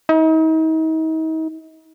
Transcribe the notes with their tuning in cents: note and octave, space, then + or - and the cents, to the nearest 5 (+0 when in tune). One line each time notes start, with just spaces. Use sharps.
D#4 +40